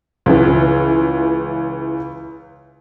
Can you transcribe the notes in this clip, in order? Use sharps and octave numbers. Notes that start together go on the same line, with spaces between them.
C#2 E3